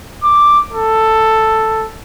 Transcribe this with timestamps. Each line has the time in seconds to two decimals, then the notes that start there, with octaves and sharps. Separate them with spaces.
0.23 D6
0.72 A4